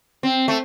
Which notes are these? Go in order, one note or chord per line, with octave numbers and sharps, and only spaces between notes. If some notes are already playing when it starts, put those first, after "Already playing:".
C4
A3